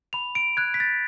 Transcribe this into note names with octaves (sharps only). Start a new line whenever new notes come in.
B5 F7
D7
F#6 G#6
B6
A6